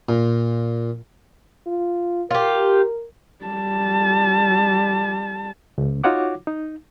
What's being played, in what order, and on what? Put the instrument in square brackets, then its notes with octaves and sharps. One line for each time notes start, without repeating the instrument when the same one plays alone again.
[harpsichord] A#2
[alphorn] F4
[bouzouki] F4 G4 [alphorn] A#4
[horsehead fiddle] G3 A5
[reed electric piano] C#2
D#4 F4 F#4 C#5 F#5 D6
D#4